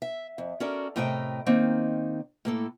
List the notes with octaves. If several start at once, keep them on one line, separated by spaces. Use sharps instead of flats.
E5
F2
C#4 F#4 A4 A#4 D5
A2 C3 A3 A#4 D#5 G5
D#3 A#3 C4 D#4
A2 A#3 A4